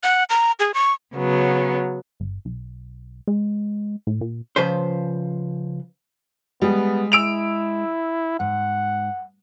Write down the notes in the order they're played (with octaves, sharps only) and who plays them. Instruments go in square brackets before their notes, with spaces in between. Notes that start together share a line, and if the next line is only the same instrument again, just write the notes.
[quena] F#5
A#5
G#4
C#6
[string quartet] C#3 F#3 B3
[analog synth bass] G1
B1
G#3
A2
A#2
[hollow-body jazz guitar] C#3 F3 B4 C5
[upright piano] G3 [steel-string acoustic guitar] G#3 G#4 [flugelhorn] B3
[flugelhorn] E4 [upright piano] E6 D7 F7
[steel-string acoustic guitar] G#2 [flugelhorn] F#5